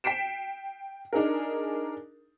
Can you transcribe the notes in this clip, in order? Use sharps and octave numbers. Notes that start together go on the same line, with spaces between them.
G5 B6 C7 D7 E7
D4 D#4 G#4 A#4